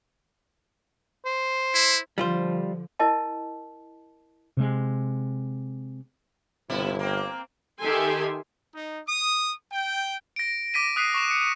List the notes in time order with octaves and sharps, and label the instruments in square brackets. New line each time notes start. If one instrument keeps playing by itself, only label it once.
[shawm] C5
[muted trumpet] E4
[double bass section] D3 F3 [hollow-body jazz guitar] G3 F4 C5
[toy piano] E4 A#4 D#5 A5
[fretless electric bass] C3 G#3
[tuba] G1 [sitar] B2 E4
[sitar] A#3 C4
[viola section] D#3 G4 A4 E5 G#5 C6
[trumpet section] D#4
D#6
G5
[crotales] A#6 D7
D6 A#6 B6 D#7
D#6 F#6 B6 C7 D#7
C#6 E7
C#7